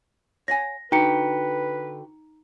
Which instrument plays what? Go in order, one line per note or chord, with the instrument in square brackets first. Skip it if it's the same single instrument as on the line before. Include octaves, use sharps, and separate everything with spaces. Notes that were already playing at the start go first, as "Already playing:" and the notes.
[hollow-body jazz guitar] C#5 F#5 G#5 [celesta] A#6
[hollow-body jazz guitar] D3 [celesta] D#4 A#5 C#7 [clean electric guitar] F#4 G5 [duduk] B4